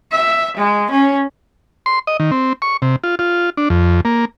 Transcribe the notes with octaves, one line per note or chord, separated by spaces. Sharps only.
E5
G#3
C#4
C6
D#5
D#3
C4
C#6
C3
F4
F4
D4
F2
A#3